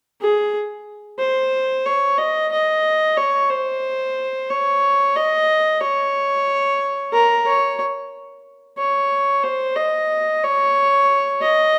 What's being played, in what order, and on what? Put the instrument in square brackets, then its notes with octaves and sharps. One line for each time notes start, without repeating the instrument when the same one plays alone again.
[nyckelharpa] G#4
C5
C#5
D#5
D#5
C#5
C5
C#5
D#5
C#5
A#4
C#5
C#5
C5
D#5
C#5
D#5